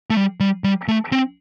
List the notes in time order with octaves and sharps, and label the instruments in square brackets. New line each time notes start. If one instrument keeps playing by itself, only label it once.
[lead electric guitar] A3
G3
G3
G3
A3
C4